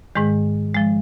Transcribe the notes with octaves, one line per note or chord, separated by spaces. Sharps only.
G#2 D#3 G#3
F3 G#3